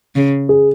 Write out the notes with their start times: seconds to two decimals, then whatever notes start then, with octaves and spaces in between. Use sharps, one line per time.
0.16 C#3
0.49 G#4